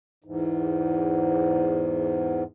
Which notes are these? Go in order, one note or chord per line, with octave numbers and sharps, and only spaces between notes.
E2 G#2